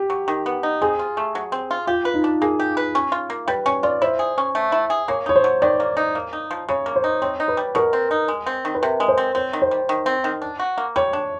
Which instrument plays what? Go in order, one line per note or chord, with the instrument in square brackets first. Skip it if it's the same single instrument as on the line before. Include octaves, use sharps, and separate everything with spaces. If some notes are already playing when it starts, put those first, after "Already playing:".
Already playing: [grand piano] G4
[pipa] F#3
D#3
B3
D#4
[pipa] C4 [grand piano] G#4
[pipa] F4
A3
F#3
C4
F4
[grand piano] F4 [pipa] G4
[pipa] B4
[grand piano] D#4
[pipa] D4
[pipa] A#3 [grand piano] G#4
[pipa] G4
B4
C#4
F4
A#3
[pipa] G3 [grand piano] B4
[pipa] C#4 [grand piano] C#5
[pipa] F4 [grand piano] D5
[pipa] E4 [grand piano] C5
[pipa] G#4
C#4
A3
E4
G#4
[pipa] A#3 [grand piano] C#5
[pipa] D#4 [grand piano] C#5
[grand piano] C5
[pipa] F#3
[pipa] D#3 [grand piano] D5
[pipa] A#3
D#4
A#3
D#4
F3
[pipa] C#3 [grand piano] C#5
[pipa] A#3
[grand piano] C5
[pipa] D#4
[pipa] C4 [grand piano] C#5
[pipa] D#4
[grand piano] B4
[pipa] G3
[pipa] B2 [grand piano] A#4
[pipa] C4
D#4
G#3
C4
D#3
[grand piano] B4
[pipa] C3 [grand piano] A#4
[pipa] G#3
[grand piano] C5
[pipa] C4
[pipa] C4 [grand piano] C#5
[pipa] D#3
[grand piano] C5
[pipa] G3
D#3
C4
D#3
D4
F#4
A#3
[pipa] G3 [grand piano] C#5
[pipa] D4